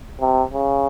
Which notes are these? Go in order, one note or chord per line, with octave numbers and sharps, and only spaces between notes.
C3
C#3